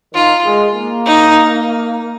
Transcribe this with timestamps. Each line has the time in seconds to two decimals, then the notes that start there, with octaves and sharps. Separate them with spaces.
0.14 D#3 F4
0.44 G#3
0.75 A#3
1.06 D#4